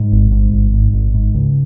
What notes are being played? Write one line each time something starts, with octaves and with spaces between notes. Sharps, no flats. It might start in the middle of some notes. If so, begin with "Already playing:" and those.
Already playing: G#2
G#1
G#2
G#1
G#2
G#1
G#2
C#2